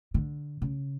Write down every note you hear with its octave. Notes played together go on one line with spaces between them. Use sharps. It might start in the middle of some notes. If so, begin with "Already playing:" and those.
D3
C#3